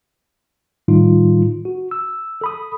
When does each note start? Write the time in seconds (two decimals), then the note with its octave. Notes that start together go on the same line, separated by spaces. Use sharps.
0.88 A2 D#3 G3 D#4 F4
1.65 F#4
1.91 E6
2.41 A4 B5 D#6